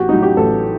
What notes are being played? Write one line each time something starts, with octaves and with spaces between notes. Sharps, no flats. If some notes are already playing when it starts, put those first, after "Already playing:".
Already playing: A1 F#4 G4
A2 F#3 D#4
G4
A1 A4